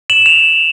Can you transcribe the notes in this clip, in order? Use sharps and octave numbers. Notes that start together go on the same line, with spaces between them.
E7 F#7
F7